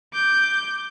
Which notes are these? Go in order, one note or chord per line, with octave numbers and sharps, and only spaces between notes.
D6 G6